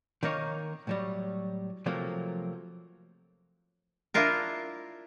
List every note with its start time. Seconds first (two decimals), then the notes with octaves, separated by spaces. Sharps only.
0.23 D#3 A#3 D#4 C#5
0.87 A2 F#3 G3
1.86 C3 F3 F#3 A3 A#3
4.14 D4 E4 F4 A#4